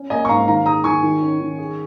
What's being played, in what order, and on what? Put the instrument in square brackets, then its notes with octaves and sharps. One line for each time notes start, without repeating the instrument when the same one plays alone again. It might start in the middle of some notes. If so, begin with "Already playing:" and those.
Already playing: [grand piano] C#4
[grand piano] A#3 [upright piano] D#5 G#5
[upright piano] C#6
[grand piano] G#2 [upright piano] F5 A#5
[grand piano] D#3 [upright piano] F5 A#5
[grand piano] G#4 [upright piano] A#5 D#6
[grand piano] D#3 [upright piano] G#5 C#6
[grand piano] D#3
C#4
D#3
G#4